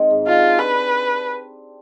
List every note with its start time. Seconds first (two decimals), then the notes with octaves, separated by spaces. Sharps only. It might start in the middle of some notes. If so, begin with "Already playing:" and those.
Already playing: D#3 G#3 C4
0.11 G#2
0.27 D4 F4
0.43 G4
0.59 D4 B4
0.75 D4